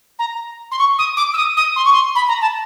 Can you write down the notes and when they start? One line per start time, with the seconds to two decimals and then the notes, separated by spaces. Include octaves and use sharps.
0.19 A#5
0.72 C6
0.79 C#6
0.98 D#6
1.17 D6
1.34 E6
1.37 D#6
1.57 D#6
1.76 C6
1.85 C#6
1.93 C6
2.15 B5
2.28 A#5
2.41 A5